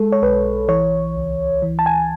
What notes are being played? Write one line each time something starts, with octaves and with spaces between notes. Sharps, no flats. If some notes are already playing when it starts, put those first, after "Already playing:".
Already playing: G#3 A4
C#5
B1 B4
E3 C#5
C#2
E3
A5
G#5